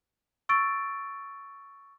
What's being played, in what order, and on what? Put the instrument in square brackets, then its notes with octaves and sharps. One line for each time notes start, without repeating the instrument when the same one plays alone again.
[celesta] C#6 E6 A6 D7